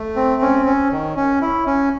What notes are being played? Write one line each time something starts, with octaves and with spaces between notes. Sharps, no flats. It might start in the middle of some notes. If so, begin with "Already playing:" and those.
Already playing: A3
C4
C#4
C#4
D#3
C#4
E4
C#4